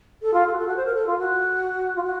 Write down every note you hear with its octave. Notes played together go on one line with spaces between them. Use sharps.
A4
F4
A4
F#4
A4
F#4
C5
A#4
A4
F4
F#4
F4
F#4